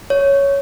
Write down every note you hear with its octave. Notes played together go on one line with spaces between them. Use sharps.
C#5